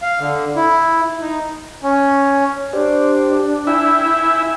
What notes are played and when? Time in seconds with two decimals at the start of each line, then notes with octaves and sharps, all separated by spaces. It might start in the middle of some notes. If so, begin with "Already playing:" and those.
0.02 F5
0.19 D3
0.56 E4
1.21 D#4
1.83 C#4
2.73 D4 G4 C5 D5
3.67 E4 G5 G#5 E6